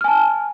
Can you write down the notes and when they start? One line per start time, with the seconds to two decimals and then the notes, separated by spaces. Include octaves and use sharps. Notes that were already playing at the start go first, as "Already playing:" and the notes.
0.01 F6
0.04 G#5
0.08 A5